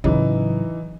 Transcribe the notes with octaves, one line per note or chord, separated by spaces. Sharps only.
A2 C#3 E3 F#3 D#4